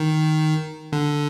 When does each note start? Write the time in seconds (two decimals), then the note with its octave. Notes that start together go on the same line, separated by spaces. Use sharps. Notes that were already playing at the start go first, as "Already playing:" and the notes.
Already playing: D#3
0.93 D3